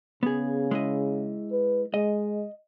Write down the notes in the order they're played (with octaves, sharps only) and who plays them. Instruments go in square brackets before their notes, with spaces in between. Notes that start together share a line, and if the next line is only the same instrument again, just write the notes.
[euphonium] C#3 [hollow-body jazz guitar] B3 G#4
[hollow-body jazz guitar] G#3 E4 D#5
[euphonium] B4
[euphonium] G#3 [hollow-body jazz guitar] D#5